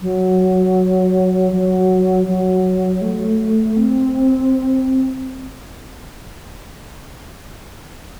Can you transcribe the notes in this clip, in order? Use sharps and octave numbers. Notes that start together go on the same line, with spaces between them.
F#3
F#3
F#3
A3
C4